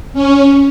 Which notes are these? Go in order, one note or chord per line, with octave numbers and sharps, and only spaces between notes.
C#4